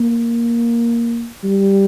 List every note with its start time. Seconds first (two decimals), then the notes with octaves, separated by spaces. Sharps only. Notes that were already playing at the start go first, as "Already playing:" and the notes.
Already playing: A#3
1.44 G3